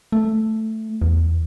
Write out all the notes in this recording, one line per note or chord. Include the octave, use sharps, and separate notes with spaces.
A3
E2